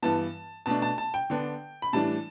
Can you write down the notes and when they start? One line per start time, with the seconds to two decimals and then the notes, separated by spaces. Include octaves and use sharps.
0.02 G2 E3 B3 A5
0.66 B2 A3 D4 A5
0.82 A5
0.98 A5
1.14 G5
1.30 D3 B3 D4
1.82 B5
1.93 A2 E3 G3 D4 A5